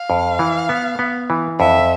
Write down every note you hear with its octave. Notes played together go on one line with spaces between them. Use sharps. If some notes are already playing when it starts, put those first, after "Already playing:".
Already playing: F5
F2
E3
B3
B3
E3
F2 E5